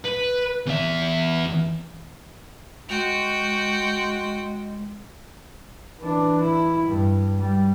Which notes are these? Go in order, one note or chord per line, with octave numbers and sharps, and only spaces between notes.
B4
E2 E5
G#3 F#4 G5
E3 D4
E4
G2
G3